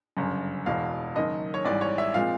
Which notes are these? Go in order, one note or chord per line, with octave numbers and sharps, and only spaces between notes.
G1 F#2 C#3
E1 E2 B2 F5
F#1 F#2 D#3 D#5
C#5
G#1 G#2 E3 G3 D5
C#5
E5
A#2 F3 G#3 C4 F5